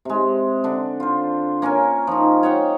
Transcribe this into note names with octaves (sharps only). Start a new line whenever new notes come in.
C3 G#3
D3 D4
F4 C5
A#3 C#4 A#4 G#5
F3 D#4
C#5 D#5 F#5 G5